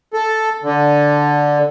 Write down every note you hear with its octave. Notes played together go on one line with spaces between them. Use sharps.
A4
D3